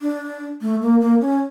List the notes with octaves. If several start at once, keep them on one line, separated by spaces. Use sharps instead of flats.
D4
A3
A#3
A#3
C#4